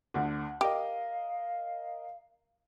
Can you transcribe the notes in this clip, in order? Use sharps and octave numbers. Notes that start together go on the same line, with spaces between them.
D2 D3
G4 A#4 D#5 F5